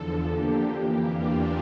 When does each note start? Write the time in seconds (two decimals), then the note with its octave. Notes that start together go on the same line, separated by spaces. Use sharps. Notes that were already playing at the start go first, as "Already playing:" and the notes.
Already playing: E2 D3 F3 A4
0.27 D3 F3 A#3 D4 G4
0.67 F2 E3 A#3 G4
1.07 E2 E3 A#3 D4 F4